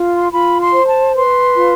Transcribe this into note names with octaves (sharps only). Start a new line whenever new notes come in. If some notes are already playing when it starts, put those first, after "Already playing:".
Already playing: F4
C6
F4 B5
C6
C5
A5
B4 C6
F4